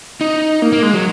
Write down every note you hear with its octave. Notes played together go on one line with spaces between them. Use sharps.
D#4
A#3
A#3
G#3
F#3